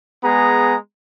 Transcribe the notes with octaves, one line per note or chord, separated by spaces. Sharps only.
G#3 B3 G#4 A#5